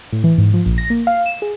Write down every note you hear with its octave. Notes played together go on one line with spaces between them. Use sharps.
A2
E3
G#2
F3
A#1
A#6
A#3
F5
E7
G#4